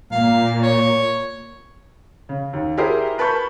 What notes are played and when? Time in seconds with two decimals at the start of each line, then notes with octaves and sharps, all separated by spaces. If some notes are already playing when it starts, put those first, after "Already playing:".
0.12 A#2 A#3 F5
0.63 C#5
2.29 C#3
2.53 D#2
2.77 E4 G4 G#4 A#4 C5
3.18 A#4 B4 A5 B5 C#6 G6